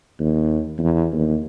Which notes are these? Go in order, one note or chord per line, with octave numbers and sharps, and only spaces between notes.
D#2
E2
D#2